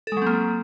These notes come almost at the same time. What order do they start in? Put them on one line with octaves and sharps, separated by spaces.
A4 G#3 F#3 C4 A#3